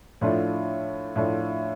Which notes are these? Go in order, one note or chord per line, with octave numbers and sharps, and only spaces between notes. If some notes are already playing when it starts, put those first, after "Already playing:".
A2 F3 A3 D4 F4
A2 F3 A3 D4 F4